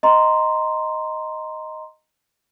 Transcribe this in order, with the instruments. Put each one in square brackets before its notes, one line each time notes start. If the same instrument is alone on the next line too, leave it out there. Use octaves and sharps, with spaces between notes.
[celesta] D#5 A#5 C6